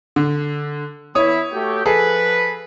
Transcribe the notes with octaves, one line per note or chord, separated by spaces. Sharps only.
D3
E3 B3 E4 C#5 D#6
A3 F#4 G4
F3 G#4 A4 B4